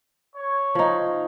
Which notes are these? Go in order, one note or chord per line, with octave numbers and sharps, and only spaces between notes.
C#5
F3 D#4